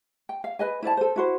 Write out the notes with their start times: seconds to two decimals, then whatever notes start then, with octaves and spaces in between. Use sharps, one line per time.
0.29 G5
0.44 F5
0.59 B4 D#5 G#5
0.83 E4 C5 D5 A5
0.97 A4 C5
1.16 E4 F#4 C5